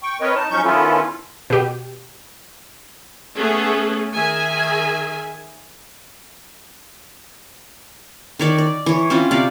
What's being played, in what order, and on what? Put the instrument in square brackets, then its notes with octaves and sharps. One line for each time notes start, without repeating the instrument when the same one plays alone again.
[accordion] G5 C#6
C4 A#4 B4 C#5 D#5
D#4 A5
F3 F#3 C#4 D#4 C#6 G6
D#3 B3 C#4 E4 F4 A4
[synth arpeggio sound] B2 G4
[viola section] A3 B3 C#4 G#4 A4
D#3 G#4 E5 G#5
[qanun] D#3 C#5 D5
D5
E3 C#5
C4 C#4 E4 F4
C3 D5 F5